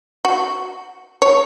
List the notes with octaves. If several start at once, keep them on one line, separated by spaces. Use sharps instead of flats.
F#4
C#5